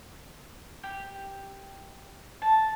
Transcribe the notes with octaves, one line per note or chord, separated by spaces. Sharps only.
G4
A5